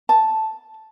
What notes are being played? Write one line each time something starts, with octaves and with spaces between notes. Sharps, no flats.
A5